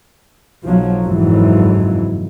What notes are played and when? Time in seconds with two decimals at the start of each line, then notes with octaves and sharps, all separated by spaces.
0.64 B1 F3 F#3
1.03 F#1 F2 G#2 E3 F#3